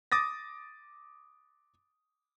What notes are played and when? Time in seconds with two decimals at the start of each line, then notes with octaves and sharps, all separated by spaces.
0.12 D6 D#6 A6 A#6